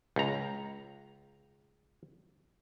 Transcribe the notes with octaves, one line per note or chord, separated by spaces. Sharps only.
C#2 A#5